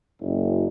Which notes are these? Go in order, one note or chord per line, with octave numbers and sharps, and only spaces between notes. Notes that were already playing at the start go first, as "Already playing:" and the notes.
F#1